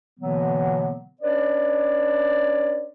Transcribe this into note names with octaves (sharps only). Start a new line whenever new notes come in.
B2 D3 E3 F#3 A#3 B3
C#4 D4 B4 C#5 D5